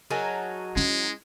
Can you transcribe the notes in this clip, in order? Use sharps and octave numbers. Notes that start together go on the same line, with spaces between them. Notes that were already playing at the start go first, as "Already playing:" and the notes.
F#3 D#4 F#4 G#4 A#4 A5
G#3 C#4 E4